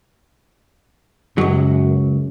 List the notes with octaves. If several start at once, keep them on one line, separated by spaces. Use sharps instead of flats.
C#2 F#2 F#3